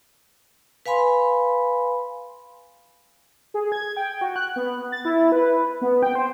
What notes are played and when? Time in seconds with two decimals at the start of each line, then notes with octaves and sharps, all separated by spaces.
0.86 B4 F5 G#5 B5 C6
3.54 G#4
3.72 G#6
3.97 G5
4.21 F#4
4.36 F#6
4.56 B3
4.92 A6
5.05 E4
5.32 B4
5.81 B3
6.03 G5
6.15 C5